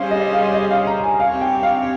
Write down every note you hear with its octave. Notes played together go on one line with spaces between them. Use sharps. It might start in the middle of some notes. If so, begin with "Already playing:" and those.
Already playing: G3 C#4 G#4 C5 F5
D#5
F5
D#5
F5
A#5
G#5
C4 G4 C#5 F5
G5
F5